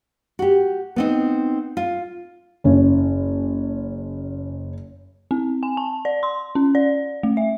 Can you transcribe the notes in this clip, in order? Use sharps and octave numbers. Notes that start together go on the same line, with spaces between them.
F#4 G4
B3 C4 D#4
F4
F#1 C#4
C4
G#5
A5
D5
C6
C#4
D5
A3
E5